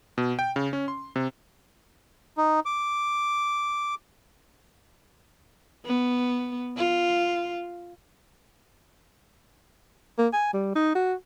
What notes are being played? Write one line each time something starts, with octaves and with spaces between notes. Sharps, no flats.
B2
G5
C#3
C#4
C6
C3
D#4
D6
B3
F4
A#3
G#5
G3
D#4
F#4